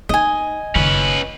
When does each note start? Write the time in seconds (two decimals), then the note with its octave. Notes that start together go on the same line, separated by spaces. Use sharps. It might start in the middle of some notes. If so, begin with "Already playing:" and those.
0.09 D#4 D#5 G#5
0.75 F#1 D#3 C#4 B4